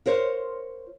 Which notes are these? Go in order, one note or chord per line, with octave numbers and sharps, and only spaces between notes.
F4 A#4 C5 C#5